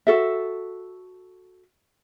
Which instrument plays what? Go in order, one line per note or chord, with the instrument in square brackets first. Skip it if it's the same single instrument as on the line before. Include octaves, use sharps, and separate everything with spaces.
[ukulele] F#4 A4 E5